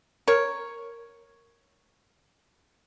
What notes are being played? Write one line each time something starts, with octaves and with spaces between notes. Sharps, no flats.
A#4 C#5